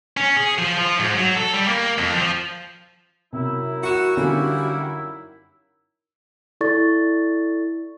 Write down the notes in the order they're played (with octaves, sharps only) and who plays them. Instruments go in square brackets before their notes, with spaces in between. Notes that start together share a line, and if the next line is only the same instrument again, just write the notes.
[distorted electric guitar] C#4
G#4
F3
F3
G#2
F#3
A4
G3
A#3
F2
F3
[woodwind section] F#2 D#4 E4 [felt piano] C3
[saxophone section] F#4 [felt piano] C#7 E7
[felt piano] D3 E3 C#4 [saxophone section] G3 A#3 F#4
[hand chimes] E4 A4 D5 C#6 A6